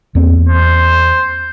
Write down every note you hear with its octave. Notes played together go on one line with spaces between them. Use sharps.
E2 A#3 C4
C5